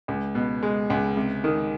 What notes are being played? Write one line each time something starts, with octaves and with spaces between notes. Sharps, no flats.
C#2
B2
G#3
C#2
C3
D#3